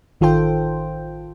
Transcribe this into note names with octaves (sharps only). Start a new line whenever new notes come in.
A1 D#3 F4 A4 C5 G5